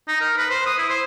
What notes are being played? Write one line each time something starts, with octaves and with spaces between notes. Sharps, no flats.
D#4
A#4
B4
C5
D#6
E4
C5